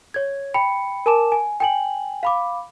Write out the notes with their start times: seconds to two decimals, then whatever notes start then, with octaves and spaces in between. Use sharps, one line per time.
0.14 C#5 G#6
0.54 G5 B5 C#7
1.06 A#4 G#5 A5 D6 E7
1.32 G#5
1.60 G5 G#5 F#7
2.23 F5 B5 D6